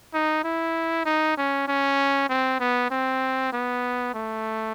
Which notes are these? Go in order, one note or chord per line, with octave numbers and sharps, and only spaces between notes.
D#4
E4
D#4
C#4
C#4
C4
B3
C4
B3
A3